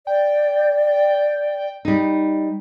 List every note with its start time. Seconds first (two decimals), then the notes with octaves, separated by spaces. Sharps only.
0.07 D5 G5
1.85 G3 D#4